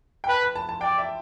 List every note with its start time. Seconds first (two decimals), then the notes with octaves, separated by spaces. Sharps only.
0.24 G5
0.29 B4 A5
0.42 B5
0.56 A5
0.69 A5
0.81 D5 G5
0.98 E5